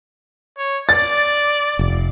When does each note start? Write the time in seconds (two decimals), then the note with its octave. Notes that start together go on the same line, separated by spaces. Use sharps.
0.58 C#5
0.89 D5 A6
1.79 F1